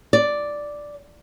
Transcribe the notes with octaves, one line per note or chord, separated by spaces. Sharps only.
D5